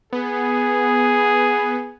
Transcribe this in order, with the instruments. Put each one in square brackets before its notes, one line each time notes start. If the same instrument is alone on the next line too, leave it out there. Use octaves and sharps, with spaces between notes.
[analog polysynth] B3 [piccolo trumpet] G#4